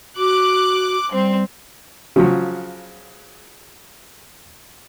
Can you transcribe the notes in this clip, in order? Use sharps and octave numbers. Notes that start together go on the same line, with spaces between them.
F#4 D6 F#6
G3 C4
C#3 F3 F#3